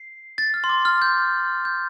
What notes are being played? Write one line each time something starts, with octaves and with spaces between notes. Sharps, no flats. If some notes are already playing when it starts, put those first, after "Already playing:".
Already playing: C7
A6
F6
C6
D6
F6
G6
G6